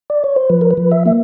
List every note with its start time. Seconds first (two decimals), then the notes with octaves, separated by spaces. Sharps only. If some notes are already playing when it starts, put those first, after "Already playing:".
0.10 D5
0.24 C#5
0.36 C5
0.49 F3 B4
0.61 A#4
0.71 B4
0.77 F3
0.91 E5
1.06 A#3 E5